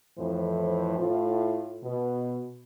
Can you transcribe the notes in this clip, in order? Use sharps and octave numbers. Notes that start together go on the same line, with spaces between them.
F2 A2 E3 C5
A2 F4
B2